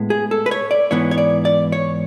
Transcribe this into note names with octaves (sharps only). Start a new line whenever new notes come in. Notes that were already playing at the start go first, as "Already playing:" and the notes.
Already playing: A2 G#3 B3
G#4
A4
B4
C#5
D5
G#2 E3 B3 C#5
C#5
D5
D5
C#5